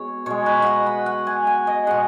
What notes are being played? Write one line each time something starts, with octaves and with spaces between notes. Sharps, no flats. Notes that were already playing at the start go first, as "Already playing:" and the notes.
Already playing: B2 G#3 C#5
B2 G#3 C#5
B4
D#5 F#5
B5
F#5
G#5
G#5
D#5
B2 G#3 F#5